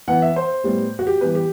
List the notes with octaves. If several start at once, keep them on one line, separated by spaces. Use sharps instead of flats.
E3 B3 F#5
E5
C5
A2 G3 B3
F#4
G4
E3 G3 B3 B4
G4